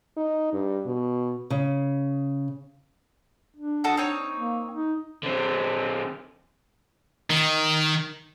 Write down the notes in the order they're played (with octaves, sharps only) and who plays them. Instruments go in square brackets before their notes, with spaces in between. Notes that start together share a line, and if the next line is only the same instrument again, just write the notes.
[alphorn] D#4
G2
B2
[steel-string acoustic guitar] C#3
[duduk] D4
[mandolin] F#4 A4 D#5
C4 D#4 C#5
[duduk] A#3
D#4
[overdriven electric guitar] D3 C4
[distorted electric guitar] D#3